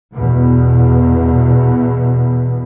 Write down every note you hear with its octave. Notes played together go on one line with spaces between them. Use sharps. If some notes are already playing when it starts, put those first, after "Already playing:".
E2 B2